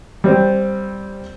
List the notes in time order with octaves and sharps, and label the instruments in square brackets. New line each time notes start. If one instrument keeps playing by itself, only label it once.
[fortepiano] G3 C4 G4